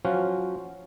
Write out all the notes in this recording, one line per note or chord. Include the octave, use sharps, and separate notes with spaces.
F3 F#3 C#4 F4 F#4 C5